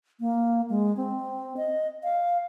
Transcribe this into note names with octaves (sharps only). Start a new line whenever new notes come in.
A#3
G#3
C4
D#5
F5